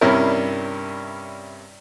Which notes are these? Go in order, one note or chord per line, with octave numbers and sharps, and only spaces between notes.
G2 C3 C#4 D4 E4 A#4